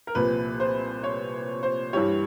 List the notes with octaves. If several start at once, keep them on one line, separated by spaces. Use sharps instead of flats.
A#4
C2 A#2 F3 B4
C5
C#5
C5
G2 E3 G3 C#5